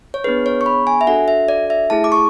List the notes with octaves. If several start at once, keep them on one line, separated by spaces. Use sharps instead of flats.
C#5
B3 D4 G#4 B4
C#5
C#6
B5
G#5
E5
D4 F#4 A4 F#5
E5
D5
E5
A3 E4 G#4 A5
D6
C#6